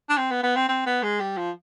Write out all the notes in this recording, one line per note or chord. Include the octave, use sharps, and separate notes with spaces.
D4
C4
B3
B3
C4
C4
B3
G#3
G3
F3